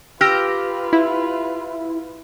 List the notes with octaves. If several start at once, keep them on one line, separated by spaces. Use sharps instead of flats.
F4 G4 B4 E6 F6 A#6
E4